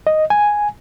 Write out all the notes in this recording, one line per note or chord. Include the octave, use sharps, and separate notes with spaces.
D#5
G#5